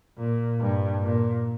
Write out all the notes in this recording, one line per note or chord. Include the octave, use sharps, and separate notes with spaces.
A#2
G2
A#2